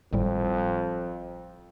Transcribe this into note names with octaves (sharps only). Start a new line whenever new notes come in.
G#1 F2 A2 G3